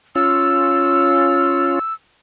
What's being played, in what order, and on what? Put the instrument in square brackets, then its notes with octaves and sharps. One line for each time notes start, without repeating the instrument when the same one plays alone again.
[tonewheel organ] C#4 F4 [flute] E6